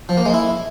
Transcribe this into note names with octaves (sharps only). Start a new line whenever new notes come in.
F3
A#3
G#3
E4